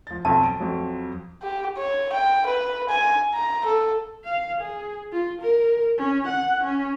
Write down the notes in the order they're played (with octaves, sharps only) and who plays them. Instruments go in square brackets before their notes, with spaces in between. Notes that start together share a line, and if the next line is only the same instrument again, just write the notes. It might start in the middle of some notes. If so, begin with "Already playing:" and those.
[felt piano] F3 A6
[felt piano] B1 F2 [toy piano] A5
[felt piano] D7
F2 F3 F#3
[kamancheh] G4
C#5
G5
B4
G#5
A#5
A4
[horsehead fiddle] F5
G#4
F4
A#4
C#4
F#5
C#4